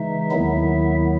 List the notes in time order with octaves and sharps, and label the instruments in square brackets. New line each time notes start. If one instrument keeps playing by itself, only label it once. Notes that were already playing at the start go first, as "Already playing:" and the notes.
Already playing: [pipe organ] C#3 E3 G#3 D#4 E5
D#2 D#3 F#3 B3 E4